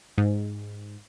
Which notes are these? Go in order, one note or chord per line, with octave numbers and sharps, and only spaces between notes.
G#2